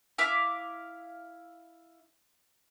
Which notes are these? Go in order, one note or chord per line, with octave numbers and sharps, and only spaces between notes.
E4 E5 F5 D6